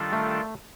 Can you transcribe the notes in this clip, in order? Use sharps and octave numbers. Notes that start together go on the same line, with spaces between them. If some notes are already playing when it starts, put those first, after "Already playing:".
Already playing: D#3 G3 D4 F4 A4
A3